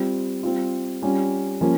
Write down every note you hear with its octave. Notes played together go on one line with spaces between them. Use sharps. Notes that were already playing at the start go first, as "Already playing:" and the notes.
Already playing: G3 C4 F4
G3 C4 F4
G3 C#4 F4
F3 A#3 C#4 F4